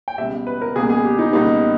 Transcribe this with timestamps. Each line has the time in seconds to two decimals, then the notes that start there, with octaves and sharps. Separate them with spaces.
0.08 G5
0.18 C#2 B2 G3 E5
0.47 B4
0.62 A#4
0.75 C#2 B2 G3 A#3 G#4
0.90 G#4
1.05 G4
1.19 D#4
1.33 C#2 B2 G3 A#3 D#4